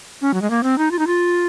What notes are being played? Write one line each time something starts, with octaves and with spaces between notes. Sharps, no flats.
C#4
F#3
G#3
A#3
C4
D#4
F4
D#4
F4